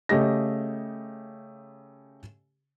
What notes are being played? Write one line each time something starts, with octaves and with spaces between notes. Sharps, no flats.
C#3 A3 G4 D#5 A#6